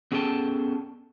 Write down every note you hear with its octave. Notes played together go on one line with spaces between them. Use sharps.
B3 C#4 G#4 A4 G5 A5